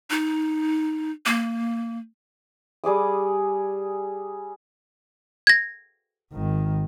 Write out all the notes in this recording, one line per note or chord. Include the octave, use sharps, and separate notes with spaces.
D#4
A#3
G3 G#4 D6 D#6
G#6 A#6
G#1 D#3